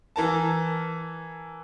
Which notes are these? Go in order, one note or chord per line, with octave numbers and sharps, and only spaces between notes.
E3 A#4 A5